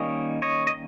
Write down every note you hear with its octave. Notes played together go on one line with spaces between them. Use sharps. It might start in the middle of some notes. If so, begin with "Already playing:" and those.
Already playing: D#3 G3 A#3 C#4 C#5 D#5
C#5 D#5
D#5